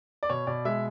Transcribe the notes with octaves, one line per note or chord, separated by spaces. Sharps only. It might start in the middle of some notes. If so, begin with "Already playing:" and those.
D5
B2 C#5
B2 D5
G#3 E5